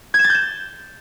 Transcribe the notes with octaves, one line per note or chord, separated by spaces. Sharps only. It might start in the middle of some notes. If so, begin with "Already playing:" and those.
G#6
E7
A6
G6
E7